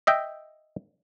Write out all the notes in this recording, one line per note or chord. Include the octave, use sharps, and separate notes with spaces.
D#5 E5 G5